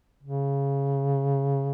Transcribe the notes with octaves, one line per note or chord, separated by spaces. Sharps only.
C#3